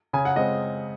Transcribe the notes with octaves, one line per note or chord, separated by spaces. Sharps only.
C#3 G#5
F#5
G#3 C4 D#5